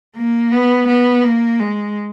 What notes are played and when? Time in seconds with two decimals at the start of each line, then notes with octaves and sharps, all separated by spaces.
0.16 A#3
0.52 B3
0.88 B3
1.24 A#3
1.59 G#3